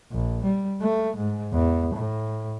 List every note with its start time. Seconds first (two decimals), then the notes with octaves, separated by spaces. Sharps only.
0.12 A#1
0.44 G3
0.81 A3
1.17 G#2
1.53 E2
1.95 A2